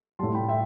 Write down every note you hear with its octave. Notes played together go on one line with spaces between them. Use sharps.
A2 G3 A5 C6
G5 B5
E5 G5